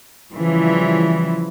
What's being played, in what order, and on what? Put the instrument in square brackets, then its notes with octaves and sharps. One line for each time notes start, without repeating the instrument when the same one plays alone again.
[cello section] C#3 E3 F3 G3